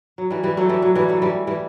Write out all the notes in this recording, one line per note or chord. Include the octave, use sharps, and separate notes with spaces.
F#3
E3 G3
E3 G3
F#3 A3
E3 G3
F#3
E3 G3
F#3 A3
E3 G3
E3 G3